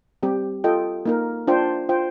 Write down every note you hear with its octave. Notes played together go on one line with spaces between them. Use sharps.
G3 C4 G4
F4 A4 D#5 G5
A#3 D#4 A#4
D4 F4 C5 G5
F4 C5 G5